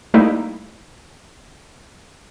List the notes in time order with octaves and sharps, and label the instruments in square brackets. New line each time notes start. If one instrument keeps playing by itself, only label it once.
[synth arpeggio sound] G3 A3 A#3 D#4 E4